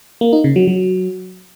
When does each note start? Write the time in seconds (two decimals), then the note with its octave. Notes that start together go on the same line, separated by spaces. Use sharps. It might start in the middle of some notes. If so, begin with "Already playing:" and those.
0.21 A#3
0.33 D#4
0.44 C#3
0.56 F#3
0.67 F#3